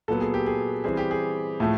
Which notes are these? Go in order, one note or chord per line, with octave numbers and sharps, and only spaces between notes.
A#2 F#3 B3 A4
G#4
G4
G#4
E3 G3 C4 G#4
G4
G#4
A2 F3 A3